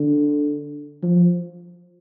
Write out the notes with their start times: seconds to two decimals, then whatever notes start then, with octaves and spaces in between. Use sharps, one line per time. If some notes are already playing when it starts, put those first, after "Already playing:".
Already playing: D3
1.03 F3